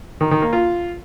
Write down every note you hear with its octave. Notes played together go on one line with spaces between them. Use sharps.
D#3
D#3
A#3
F4